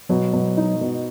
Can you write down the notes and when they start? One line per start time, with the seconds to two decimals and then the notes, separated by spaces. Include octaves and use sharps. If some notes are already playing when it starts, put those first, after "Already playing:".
0.09 B2 F#3
0.33 B2
0.57 D#4
0.81 B2